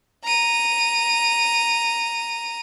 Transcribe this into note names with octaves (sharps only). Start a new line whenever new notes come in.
A#5 D#7